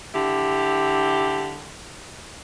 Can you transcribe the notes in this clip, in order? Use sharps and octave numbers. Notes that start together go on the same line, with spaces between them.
D3 E4 G4